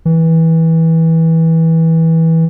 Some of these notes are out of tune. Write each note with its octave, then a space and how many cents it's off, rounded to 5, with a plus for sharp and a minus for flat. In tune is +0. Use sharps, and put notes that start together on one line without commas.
E3 -20